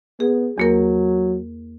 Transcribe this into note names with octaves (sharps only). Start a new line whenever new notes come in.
B3 G#4
E2 F#3 A#3 A#4